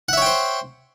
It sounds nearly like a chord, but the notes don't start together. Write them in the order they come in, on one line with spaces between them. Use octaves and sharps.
F#5 E5 C#5 G5 C5